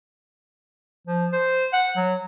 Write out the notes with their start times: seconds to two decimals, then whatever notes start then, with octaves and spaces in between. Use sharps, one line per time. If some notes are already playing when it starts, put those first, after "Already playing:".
1.07 F3
1.32 C5
1.73 F#5
1.97 F#3